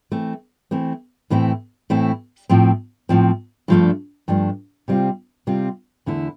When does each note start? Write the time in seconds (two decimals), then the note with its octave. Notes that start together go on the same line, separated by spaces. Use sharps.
0.11 E3 A3 C4
0.71 E3 A3 C4
1.30 A2 E3 A3 C4 E4
1.90 A2 E3 A3 C4 E4
2.49 A2 F3 C4
3.09 A2 F3 C4
3.68 G2 F3 A3 D4
4.28 G2 F3 A3 D4
4.88 C3 G3 C4 F4
5.47 C3 G3 C4 F4
6.06 E2 D3 A3 E4